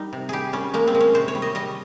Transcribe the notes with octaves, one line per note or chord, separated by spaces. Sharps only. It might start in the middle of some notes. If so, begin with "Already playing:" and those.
Already playing: G3 D#4
C3
G3 G4 G#4
G3 C#4
G#3 A#3
C4
G#3
C#4
C3 C5
C#5
G3
D#5
G3 D#5